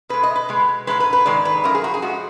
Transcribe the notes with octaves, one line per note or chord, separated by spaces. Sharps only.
B2 G#3 B4
D#5
B4
B2 G#3
G#2 D#3 G#3 B4
B4
B4
G#2 D#3 G#3 D5
B4
F#2 F3 A#4
G#4
F#4
G#4
F3 G#3 F#4